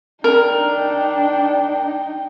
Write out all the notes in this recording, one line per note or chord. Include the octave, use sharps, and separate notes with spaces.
D4 D#4 A#4 G5